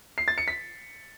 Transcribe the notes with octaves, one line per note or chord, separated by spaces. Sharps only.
C7
A6
C#7
B6